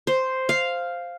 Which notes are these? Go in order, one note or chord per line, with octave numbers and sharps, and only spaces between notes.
C5
F5